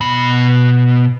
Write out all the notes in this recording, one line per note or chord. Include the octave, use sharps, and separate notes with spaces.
B2 B5